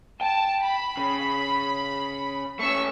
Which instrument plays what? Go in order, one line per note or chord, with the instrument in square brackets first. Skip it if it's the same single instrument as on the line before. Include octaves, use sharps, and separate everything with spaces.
[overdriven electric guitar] G5 [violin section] A5
[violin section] B5
[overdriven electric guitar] C#3
[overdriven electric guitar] A3 C#4 [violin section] C#6 E6